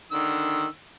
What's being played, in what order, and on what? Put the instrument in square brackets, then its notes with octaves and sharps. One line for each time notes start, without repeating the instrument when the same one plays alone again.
[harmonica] D3 D#3 E6